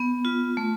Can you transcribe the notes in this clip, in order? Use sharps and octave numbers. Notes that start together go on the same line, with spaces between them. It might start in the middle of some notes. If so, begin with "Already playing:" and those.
Already playing: B3
F4
A3